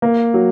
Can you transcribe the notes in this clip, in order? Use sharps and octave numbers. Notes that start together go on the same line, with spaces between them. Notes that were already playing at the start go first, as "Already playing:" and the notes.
A#3
F#3